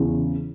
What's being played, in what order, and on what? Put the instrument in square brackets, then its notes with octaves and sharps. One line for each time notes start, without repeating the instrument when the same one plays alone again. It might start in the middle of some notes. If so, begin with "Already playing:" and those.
Already playing: [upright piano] E2 C#3 E3